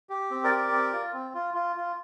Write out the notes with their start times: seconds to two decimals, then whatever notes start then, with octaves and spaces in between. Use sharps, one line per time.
0.10 G4
0.31 C4
0.44 A#4 D5
0.51 G4
0.72 C4
0.93 F4
1.14 C4
1.35 F4
1.54 F4
1.76 F4